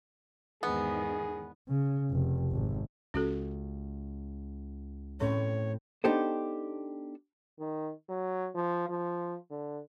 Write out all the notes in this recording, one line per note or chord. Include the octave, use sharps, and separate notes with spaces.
E2 G#2 D#3 B3 G#4
C#3
F1
G#1
C#2 C#4 F#4 A4
A2 C4 C#4 C#5
B3 D4 D#4 G4 A4 C5
D#3
F#3
F3
F3
D3